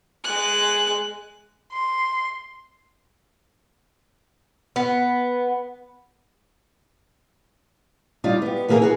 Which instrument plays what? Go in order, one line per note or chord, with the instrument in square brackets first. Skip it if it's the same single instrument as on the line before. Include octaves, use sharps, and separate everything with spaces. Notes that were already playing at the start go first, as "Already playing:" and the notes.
[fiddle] G#3 F#6
[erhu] C6
[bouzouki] B3
[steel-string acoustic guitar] G3 D#4 F4 D5
B3 G4
D#3 E3 A#3 D#4 G#4 A#4
F#4 G#4 B4